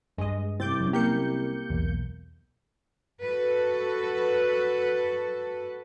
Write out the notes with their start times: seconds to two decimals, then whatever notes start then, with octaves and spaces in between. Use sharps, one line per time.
0.18 G2 G#3 D#5
0.60 C2 C4 D6 G6 A6
0.81 F#3 G3 C#4
0.93 A#3 G4 A#4 G6 C#7
1.70 B1 E2
3.24 F#4 A4 B4